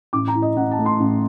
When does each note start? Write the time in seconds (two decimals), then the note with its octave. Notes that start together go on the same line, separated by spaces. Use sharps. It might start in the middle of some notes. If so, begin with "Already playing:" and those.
0.13 A1 D6
0.28 A#5
0.35 A2
0.42 D#5
0.56 A1 F#5
0.71 A5
0.79 A3
0.86 C6
1.00 A1